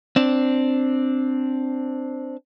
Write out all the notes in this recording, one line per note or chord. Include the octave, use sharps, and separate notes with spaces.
C4 D4